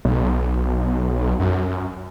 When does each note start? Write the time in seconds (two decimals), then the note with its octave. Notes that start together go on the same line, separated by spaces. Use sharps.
0.05 B1
1.40 F#2